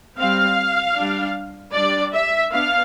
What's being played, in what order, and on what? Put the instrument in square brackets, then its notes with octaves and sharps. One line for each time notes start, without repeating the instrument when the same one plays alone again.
[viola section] G3 C4 F5
G3 D4
G3 D4 D5
E5
B3 D4 F5